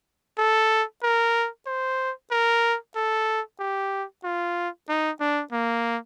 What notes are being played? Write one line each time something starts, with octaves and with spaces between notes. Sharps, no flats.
A4
A#4
C5
A#4
A4
G4
F4
D#4
D4
A#3